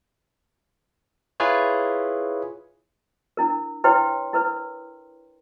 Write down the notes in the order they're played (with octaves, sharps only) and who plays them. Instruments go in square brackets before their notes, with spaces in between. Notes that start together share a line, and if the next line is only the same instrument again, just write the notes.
[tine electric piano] E4 F4 G#4 B4 C#5
[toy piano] D4 E4 A#4
E4 B4 C#5 G5 C6
E4 A#4 B4